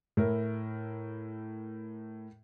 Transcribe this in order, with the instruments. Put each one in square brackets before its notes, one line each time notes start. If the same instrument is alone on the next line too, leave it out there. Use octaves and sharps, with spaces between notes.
[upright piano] A2 E4 A#4